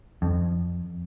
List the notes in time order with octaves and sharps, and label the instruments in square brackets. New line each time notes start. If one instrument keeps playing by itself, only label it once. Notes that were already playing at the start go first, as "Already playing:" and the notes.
[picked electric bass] F2